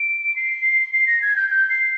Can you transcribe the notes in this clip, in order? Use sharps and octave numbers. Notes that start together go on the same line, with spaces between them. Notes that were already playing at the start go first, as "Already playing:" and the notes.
Already playing: D7
C7
C7
A#6
G#6
G6
G6
C7